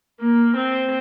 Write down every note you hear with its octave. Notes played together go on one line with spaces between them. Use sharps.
A#3
C4